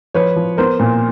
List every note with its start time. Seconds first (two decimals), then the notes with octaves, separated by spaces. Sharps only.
0.14 F3 B4 C#5
0.36 F3
0.58 B3 A#4 C5
0.80 A#2